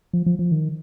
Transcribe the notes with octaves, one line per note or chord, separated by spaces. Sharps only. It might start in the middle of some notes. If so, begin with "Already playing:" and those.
F3
F3
F3
D#3